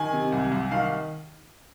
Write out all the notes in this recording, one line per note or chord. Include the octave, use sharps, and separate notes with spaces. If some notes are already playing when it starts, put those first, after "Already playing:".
Already playing: D#3 G#5
C3
C2
C2
D#3 F5